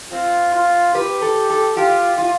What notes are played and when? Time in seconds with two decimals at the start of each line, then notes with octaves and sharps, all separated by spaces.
0.12 C4 F4
0.53 F4
0.94 G4 B4
1.22 A4
1.50 A4
1.77 F4 G4
2.18 F4